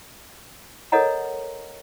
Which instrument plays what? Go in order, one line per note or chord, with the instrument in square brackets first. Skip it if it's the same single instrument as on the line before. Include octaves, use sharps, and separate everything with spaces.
[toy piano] A4 A#4 C#5 D#5 F#5 A#5